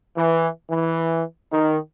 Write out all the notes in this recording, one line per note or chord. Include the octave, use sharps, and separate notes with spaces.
E3
E3
D#3